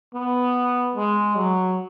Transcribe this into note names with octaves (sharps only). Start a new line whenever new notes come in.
B3
G#3
F#3